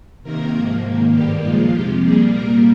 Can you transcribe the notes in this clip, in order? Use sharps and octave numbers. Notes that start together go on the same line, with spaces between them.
C3 D#3 A#3 A#4
G#2 F3 A#3
G#2 D#3 A#3
G2 D#3 G3 A#3 G4
A#2 F3 G#3 F4
F2 C3 F3 G4
A#2 G3 A#3 G#4
A#2 G3 A#3 A#4